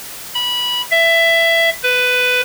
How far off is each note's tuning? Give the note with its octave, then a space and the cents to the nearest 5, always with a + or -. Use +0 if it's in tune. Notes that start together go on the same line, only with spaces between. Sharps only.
B5 -15
E5 +15
B4 +10